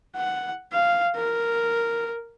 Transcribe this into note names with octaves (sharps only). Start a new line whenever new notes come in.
F#5
F5
A#4